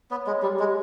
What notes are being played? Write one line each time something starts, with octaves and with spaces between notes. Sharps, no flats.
B3 C#5
G#3
G3 G4
G#3